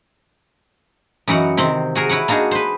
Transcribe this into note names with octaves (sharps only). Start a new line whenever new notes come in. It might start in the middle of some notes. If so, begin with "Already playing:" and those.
F#2 E3 D#4 F#4 F#5
C3 D#3 C4
F#4 G#4 A#4
E4 B4 C#5 F#5
A#3 D4 D#4 F#4 G#4
B4 C5